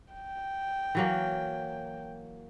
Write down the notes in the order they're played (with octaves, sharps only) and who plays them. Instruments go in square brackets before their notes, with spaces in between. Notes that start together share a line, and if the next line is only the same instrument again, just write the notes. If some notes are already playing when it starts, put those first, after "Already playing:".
[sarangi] G5
[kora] E3 F#3 A#3